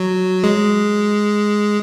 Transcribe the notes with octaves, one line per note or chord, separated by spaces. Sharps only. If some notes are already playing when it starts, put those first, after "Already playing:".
Already playing: F#3
G#3